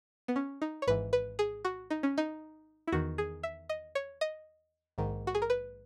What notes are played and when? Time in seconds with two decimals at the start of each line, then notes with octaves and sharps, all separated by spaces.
0.28 B3
0.36 C#4
0.62 D#4
0.82 C#5
0.87 G#1 G#2 E3 B4
1.13 B4
1.39 G#4
1.65 F#4
1.90 D#4
2.03 C#4
2.18 D#4
2.87 E4
2.92 E2 D#3 F#4
3.18 G#4
3.43 E5
3.69 D#5
3.95 C#5
4.21 D#5
4.98 A#1 G#2 D#3
5.27 F#4
5.35 G#4
5.42 A#4
5.50 B4